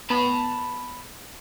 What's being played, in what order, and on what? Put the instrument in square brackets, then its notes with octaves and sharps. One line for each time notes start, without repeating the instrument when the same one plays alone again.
[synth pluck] B3 [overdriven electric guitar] A5 B5